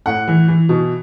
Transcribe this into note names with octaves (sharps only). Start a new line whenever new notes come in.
A2 F#5
E3
E3
B2